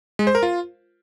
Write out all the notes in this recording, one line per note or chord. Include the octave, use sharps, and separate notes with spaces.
G#3
C5
A#4
F4